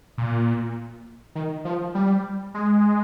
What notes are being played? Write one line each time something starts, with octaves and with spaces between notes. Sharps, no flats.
A#2
D#3
F3
G3
G#3